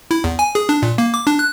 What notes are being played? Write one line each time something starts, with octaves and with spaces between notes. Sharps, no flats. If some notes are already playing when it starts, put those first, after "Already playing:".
E4
E2
G#5
G#4
D4
A#2
A#3
D6
D4
F#6